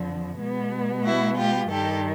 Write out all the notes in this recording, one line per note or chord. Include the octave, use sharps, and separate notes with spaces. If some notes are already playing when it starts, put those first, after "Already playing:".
Already playing: F2 D3 F3
B2 G#3 B3
E4 F#4
F4 G4
G2 D#3 G3 G4 A4